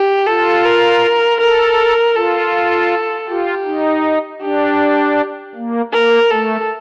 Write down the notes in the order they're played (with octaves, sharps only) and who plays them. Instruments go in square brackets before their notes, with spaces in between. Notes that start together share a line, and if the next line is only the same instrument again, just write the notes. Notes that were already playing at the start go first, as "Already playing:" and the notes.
Already playing: [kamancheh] G4
[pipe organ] F4 [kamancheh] A4
[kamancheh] A#4
[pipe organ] A4 [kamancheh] A#4
[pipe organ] F4 [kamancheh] A4
[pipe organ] F4 [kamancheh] G4
[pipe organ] D#4
[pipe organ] D4 [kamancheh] G4
[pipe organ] A#3
[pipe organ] A#3 [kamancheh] A#4
[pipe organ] A3 [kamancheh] A4